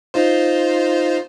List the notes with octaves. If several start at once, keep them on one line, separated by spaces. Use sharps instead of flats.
D#4 F4 C5